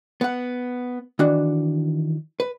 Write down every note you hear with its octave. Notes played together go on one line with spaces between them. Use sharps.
B3 F#5
D#3 E3 D4 F#4
B4